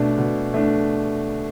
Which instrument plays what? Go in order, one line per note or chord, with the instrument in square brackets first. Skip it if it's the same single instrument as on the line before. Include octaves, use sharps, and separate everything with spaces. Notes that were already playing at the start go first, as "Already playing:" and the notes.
Already playing: [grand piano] B2 A3 D4
B2
A3 D4